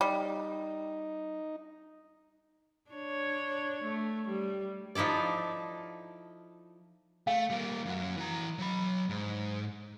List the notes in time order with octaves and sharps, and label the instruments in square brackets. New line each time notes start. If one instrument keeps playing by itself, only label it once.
[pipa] G3 [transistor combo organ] D#4
[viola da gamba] D4 C#5
A3
G3
[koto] F3 D#4 E4 A4 D5
[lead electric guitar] A3 [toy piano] F5
[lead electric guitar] G3 A#3
F#2 F#4
E3 A#5
F#3 B5
G#2